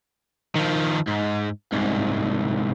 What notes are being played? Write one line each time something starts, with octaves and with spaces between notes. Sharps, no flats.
D#3 F3
G#2
C2 G#2